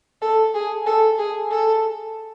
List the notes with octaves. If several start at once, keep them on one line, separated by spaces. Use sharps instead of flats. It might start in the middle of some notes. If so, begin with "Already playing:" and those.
A4
G#4
A4
G#4
A4